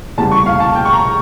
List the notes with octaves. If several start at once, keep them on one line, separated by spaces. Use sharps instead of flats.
F1 E2 C#3 G3 A5
C#6
F5
A5
G5
C#6
A#5